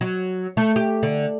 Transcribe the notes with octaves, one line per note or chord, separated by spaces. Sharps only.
F#3
A3
G4
D3